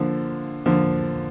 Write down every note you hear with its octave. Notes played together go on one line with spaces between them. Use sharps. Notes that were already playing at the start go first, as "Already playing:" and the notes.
Already playing: D3 F3 A#3
D3 F3 A#3